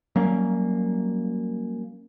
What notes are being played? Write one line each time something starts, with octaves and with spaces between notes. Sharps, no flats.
F#3 G3 A#3 C#4